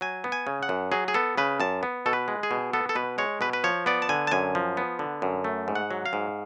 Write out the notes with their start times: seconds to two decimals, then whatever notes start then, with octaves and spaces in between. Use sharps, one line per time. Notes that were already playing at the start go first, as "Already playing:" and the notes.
0.01 F#3 G#5
0.24 B3
0.32 G#5
0.47 C#3
0.63 F#5
0.69 F#2
0.92 F#3 G#4
1.08 G#4
1.14 B3 A4
1.38 C#3 B4
1.60 F#2 A5
1.83 B3
2.06 B2 A4
2.13 B4
2.28 G#3
2.43 G#4
2.51 B2
2.73 B3 A4
2.89 A4
2.95 B2 B4
3.18 G#3 C#5
3.41 B2 B4
3.53 B4
3.64 F3 C#5
3.86 B3 D5
4.02 A5
4.09 D3 G#5
4.27 A5
4.31 F#2 G#5
4.55 F3
4.77 B3
4.99 D3
5.22 F#2
5.44 A3
5.68 G#2
5.75 F#5
5.91 F#3
6.06 F5
6.13 G#2